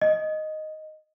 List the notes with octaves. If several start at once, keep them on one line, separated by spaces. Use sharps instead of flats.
D#5